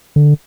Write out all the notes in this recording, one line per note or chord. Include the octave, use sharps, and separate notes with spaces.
D3